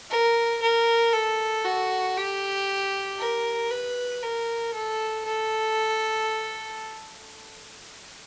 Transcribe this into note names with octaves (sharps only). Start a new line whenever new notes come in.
A#4
A#4
A4
F#4
G4
A#4
B4
A#4
A4
A4